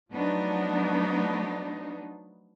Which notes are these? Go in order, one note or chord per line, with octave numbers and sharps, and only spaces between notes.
F3 F#3 A3 B3 D4 D#4